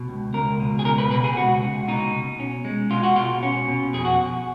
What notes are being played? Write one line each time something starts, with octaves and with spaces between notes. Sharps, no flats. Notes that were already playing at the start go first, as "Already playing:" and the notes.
Already playing: B2
C#2
C#2 A#4
B2
G#4
C#2 A#4
B4
B2 B4
G#4
C#2 F#4
C#2
B2 D#4
B2
C#4
G#3
B2 F4
F#4
B2 F4
C#4
B2
F2 G#4
F#4